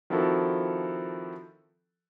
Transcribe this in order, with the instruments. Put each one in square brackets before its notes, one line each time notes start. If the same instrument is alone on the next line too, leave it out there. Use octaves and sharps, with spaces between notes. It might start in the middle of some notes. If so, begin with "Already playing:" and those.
[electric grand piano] D#3 F3 C4 E4 F#4 A4